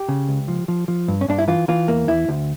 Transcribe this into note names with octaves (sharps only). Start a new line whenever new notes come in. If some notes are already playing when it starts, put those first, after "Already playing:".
Already playing: G4
C#3
C#2
F3
F3
F3
G2
C#4
G2 D4
E4
E3 F4
E3 F4
E2 A#3
E2 E4
D2